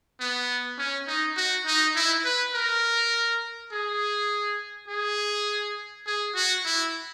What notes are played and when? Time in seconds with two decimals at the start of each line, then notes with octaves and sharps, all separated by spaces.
0.20 B3
0.78 C#4
1.08 D#4
1.36 F#4
1.66 D#4
1.96 E4
2.25 B4
2.54 A#4
3.72 G#4
4.88 G#4
6.06 G#4
6.35 F#4
6.65 E4